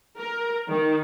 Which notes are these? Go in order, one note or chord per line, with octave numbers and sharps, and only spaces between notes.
A#4
D#3